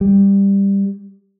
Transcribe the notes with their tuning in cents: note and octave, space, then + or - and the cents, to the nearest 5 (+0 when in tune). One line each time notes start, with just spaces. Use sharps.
G3 +15